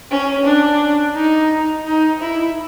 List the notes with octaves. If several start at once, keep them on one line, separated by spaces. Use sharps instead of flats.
C#4
D4
D#4
D#4
E4